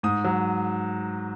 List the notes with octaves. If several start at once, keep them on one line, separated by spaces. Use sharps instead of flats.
G#2 D#6
F#3